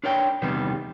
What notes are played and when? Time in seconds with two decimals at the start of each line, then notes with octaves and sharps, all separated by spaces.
0.04 D4 A#4 C#5 D5 G5
0.42 E2 C3 D#3 G3 B3